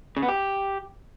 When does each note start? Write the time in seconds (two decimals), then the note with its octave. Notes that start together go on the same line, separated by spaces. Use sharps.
0.17 C#3
0.23 B3
0.28 G4